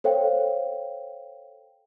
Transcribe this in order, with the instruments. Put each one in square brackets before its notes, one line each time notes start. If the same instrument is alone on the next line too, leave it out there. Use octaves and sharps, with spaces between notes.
[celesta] A4 C5 C#5 F5 G5